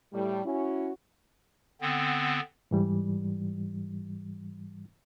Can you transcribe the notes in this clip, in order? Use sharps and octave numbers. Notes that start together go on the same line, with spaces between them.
A2 G3
C#4 E4 F#4
D3 B3 C4
G#2 E3 G3